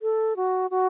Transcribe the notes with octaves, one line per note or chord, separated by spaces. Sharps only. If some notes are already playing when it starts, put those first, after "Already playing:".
A4
F#4
F#4